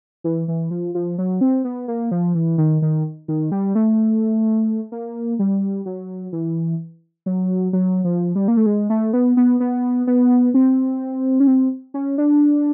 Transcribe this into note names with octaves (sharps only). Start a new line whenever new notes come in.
E3
E3
F3
F3
F#3
C4
B3
A#3
F3
E3
D#3
D#3
D#3
G3
A3
A#3
G3
F#3
E3
F#3
F#3
F3
G3
A#3
A3
G#3
A3
B3
B3
B3
B3
C4
C#4
C4
C#4
D4